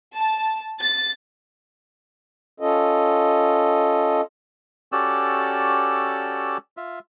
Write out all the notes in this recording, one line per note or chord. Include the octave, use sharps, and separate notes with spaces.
A5
A6
C#4 F4 A4 D#5
C#4 F#4 G4 A4 D5 E6
F4 E5